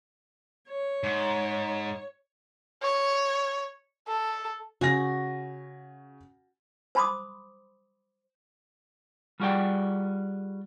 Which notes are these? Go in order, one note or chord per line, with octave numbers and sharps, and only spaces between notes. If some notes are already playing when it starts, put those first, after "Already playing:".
C#5
G#2
C#5
A4
C#3 F#4 G#5 A#6
C5 A5 B5 C6 D6 D#6
G3 F4 F#4 G#4 D5 G5